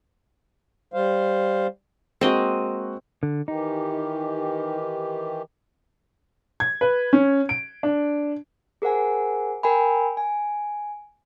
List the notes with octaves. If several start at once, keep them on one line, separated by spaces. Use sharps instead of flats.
G3 C5 F5
G#3 A#3 C4 F#4 D#5
D3
D#3 E3 D#4 G4
G#6
B4
C#4
D7
D4
G#4 A#4 C5 F#5 G#5
A#4 G5 G#5 B5
G#5